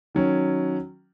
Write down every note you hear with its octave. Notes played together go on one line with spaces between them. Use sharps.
D#3 F#3 C#4